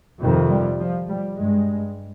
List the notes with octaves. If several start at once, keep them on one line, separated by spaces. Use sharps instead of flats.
F2 C3 D#3
G3
F3
G3
G2 G#3